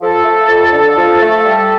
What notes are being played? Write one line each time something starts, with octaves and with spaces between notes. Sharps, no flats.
F3 A4
A3
F2
D3
F3
A3
G3